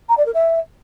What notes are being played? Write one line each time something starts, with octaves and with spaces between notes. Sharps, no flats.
A#5
D5
A#4
E5